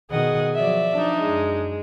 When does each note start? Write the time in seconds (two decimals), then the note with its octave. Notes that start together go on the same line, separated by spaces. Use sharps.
0.10 B2 D#3 G#4 D#5 F#5
0.55 F3 F#3 D5 E5
0.93 D4 D#4
1.22 F#2 G#3